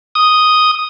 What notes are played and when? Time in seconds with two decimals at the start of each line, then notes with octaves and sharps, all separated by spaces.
0.15 D#6